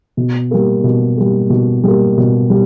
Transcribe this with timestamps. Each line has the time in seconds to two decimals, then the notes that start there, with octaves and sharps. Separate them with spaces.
0.17 B2
0.51 G3 A#3
0.84 B2
1.17 G3 A#3
1.50 B2
1.84 G3 A#3
2.17 B2
2.50 G3